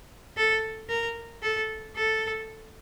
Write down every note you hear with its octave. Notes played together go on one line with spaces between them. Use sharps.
A4
A#4
A4
A4